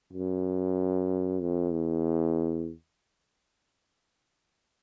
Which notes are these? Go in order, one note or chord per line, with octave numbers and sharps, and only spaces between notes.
F#2
F2
E2